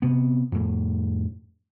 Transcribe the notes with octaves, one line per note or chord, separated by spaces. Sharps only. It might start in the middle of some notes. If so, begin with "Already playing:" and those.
C3 B3
F2 A2